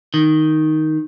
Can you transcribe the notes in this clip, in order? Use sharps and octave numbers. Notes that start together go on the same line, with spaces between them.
D#3